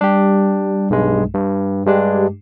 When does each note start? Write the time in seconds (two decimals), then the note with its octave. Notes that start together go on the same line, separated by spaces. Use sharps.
0.01 G3 D4 G4
0.90 B1 G2 G#3
1.35 G2
1.86 G2 G#3 D4 G4